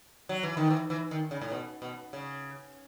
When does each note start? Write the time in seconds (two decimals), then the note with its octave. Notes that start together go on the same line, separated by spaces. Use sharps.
0.29 F#3
0.43 E3
0.57 D#3
0.70 E3
0.90 E3
1.11 D#3
1.31 C#3
1.41 A2
1.52 B2
1.82 B2
2.13 C#3